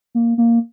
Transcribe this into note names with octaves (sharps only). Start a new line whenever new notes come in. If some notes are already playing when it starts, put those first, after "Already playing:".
A#3
A#3